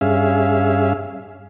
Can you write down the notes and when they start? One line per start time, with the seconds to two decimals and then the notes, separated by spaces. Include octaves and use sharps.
0.01 G2 C#4 G#4 E5 F5